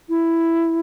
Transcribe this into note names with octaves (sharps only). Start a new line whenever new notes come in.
E4